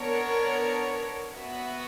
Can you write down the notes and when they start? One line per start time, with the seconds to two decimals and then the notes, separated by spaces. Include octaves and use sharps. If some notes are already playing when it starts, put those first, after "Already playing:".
Already playing: B3 D4 A#4 C#5
1.35 B3 F#4 B4 E5